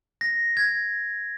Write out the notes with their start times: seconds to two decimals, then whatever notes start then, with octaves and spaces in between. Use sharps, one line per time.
0.21 A#6
0.57 G#6